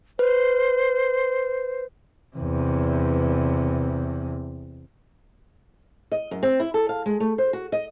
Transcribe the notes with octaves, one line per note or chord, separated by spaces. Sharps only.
B4 C5
E2 C3
D#5
F#2
C4
E4
A4
F5
G#3
A3
C5
F#4
D#5